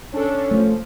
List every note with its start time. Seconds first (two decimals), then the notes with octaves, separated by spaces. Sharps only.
0.13 C#4 D4 A4
0.51 F3 A3